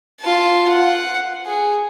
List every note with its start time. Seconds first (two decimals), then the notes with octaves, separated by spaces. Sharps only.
0.20 F4 A5
0.69 F#5
1.46 G#4